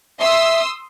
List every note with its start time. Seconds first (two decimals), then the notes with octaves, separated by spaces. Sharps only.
0.20 E5 C6 D#6 E6